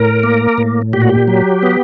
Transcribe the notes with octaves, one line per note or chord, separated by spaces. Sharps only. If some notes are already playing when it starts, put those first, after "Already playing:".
Already playing: A2 A#4
A#3
A2
A#2 G4
F#4
G4
F#3
B3